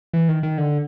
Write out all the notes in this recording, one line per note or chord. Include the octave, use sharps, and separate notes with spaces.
E3
D#3
D#3
D3